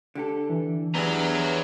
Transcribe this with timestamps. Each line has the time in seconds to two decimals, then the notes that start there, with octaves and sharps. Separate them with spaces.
0.15 D3 G4 A4
0.50 E3
0.95 E2 B3 D4 G4 C#5 A#5